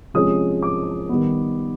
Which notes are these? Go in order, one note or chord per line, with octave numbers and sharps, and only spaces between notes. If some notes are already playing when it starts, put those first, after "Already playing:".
C3 F3 G#3 C#4 D#6
D6
D#3 G3 B3